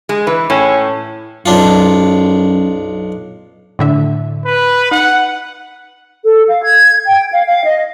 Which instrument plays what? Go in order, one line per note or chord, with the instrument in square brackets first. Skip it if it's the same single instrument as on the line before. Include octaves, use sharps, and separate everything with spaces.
[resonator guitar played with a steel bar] G#3
[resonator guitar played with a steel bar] E3 [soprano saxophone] B4
[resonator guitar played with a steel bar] A2 [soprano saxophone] C#4
[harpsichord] B1 D4 F4 [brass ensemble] F#2
[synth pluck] A2 D3 E5
[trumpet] B4
[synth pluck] D#4 [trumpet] F#5
[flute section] A4
F5
G#6
G5
F5
F5
D#5